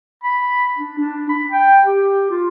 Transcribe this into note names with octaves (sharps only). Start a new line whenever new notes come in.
B5
D4
D4
B5
G5
G4
F4